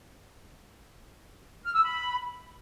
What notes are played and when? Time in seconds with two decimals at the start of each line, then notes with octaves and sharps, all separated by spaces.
1.64 F6
1.74 E6
1.83 B5